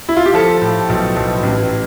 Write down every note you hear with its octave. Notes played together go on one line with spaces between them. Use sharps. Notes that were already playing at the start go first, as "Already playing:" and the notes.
E4
F4
G4
F3 A4
A2
B1
B1
A1